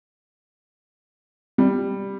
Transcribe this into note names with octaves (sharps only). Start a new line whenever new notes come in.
G3